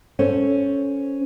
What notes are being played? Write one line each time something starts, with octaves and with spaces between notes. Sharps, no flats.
C#4 A4 C5 C#5